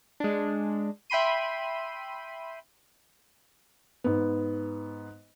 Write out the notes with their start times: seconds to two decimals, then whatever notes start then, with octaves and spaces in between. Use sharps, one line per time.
0.20 G#3 D4
1.10 E5 G5 B5 C6 D#7
4.04 G#2 B3